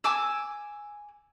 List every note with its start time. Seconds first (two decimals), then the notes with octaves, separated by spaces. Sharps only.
0.04 G#5 D6 E6